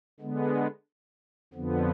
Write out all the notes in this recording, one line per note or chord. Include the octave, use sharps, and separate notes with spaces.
D3 G#3 B3
F2 D3 F3 B3